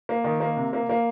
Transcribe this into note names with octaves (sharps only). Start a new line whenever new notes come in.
A#3
D#3
A#3
C3
A#3
A#3